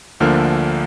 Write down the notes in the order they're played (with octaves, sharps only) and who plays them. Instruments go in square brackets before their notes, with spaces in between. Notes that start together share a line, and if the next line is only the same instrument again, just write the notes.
[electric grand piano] D2 D3 F3 A#3 D4 F6